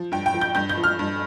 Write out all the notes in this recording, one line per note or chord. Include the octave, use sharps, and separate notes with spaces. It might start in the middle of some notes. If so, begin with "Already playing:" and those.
Already playing: F3
G2 G5
G5
F3
G6
G2 G6
G6
F3
F6
G2